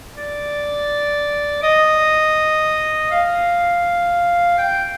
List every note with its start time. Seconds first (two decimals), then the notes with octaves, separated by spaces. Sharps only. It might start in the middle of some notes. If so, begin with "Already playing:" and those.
0.15 D5
1.63 D#5
3.11 F5
4.58 G5